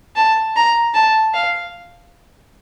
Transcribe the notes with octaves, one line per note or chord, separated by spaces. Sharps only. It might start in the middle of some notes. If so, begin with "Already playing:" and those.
A5
A#5
A5
F5